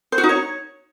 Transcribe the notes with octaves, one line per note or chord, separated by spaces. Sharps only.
C5
F#4
D#4
C#5